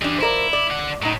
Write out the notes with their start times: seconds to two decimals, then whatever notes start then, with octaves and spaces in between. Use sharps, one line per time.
0.02 E3 G3 D4 G#4
0.21 F3 E4 A#4 D5
0.53 D5
0.71 D3 F#5
1.02 A2 F#3 D#4